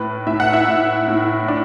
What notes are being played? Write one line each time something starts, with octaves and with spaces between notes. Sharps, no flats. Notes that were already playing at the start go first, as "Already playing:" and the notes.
Already playing: A2 B4
A2 E5
F#5
E4 E5
A2
A2
D4